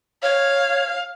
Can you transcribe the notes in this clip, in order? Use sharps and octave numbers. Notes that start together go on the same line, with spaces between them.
C#5 F5